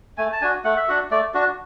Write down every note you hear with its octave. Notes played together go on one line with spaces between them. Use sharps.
A3 G#5
A5
D4 F#4 G#5
A3 F#5
E5
D4 F#4 F#5
A3 D5
D4 F#4